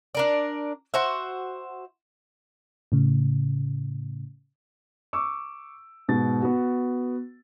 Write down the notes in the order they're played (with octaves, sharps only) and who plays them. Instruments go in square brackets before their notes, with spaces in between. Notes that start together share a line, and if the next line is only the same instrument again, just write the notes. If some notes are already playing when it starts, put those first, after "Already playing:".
[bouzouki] D4 A#4 D5
F#4 C5 E5
[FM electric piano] A2 C#3
[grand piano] C#6 D6 E6
G#2 B2 A6
B3 F#4